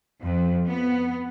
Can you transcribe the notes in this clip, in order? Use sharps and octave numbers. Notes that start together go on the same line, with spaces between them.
F2
B3